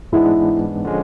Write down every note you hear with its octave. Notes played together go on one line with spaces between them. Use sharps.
G#2 E3 G#3 B3 D4 E4
D3 F3 G#3 C#4